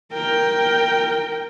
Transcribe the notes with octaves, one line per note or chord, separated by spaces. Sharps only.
A#4 G5